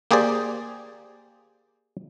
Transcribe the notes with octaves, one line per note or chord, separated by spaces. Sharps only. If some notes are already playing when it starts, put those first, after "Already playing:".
A#3 G4 G#4 C5 D5